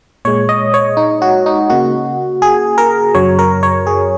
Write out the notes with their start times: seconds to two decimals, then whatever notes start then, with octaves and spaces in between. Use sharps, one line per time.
0.25 A#2 G#3 C#5
0.49 D#5
0.74 C#5
0.97 D#4
1.22 F#4
1.46 D#4
1.70 C#3 A#3 F#4
2.42 G#4
2.78 A#4
3.14 F#2 C#3 F#3 C#5
3.39 A#4
3.63 C#5
3.87 G#4